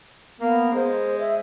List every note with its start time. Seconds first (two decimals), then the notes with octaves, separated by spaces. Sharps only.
0.40 A#3 B3
0.74 G#3 C5
1.19 E5